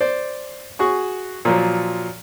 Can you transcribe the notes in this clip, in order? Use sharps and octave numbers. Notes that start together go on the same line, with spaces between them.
C5 D5
F#4 G#4 C#6
A#2 F3 F#3